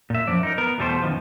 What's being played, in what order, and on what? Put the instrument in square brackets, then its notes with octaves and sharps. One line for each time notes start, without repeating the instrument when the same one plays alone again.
[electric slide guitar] A#2 E5
F#2 F3 D5
D#4 A#4
B3 A#4
E2 B2 G3 A3 C5
F#2 B2 D#3 F3